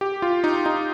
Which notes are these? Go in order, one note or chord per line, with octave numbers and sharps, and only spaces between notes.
G4
F4
D#4
D#4